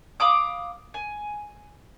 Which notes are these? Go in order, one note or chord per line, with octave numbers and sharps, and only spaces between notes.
F5 B5 D6 D#6
G#5